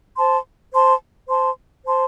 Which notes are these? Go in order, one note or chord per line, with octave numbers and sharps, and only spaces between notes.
C5 A5 C6
C5 A5 C6
C5 A5 C6
C5 A5 C6